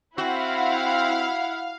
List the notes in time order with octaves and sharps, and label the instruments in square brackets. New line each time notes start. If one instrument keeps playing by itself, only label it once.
[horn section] C4 [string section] E4 F#5 [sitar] F#4 [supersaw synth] F5